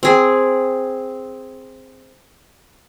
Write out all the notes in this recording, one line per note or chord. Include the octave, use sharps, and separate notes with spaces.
C4 G#4